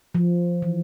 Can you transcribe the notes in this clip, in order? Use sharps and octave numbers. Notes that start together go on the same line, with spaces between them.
F3
E3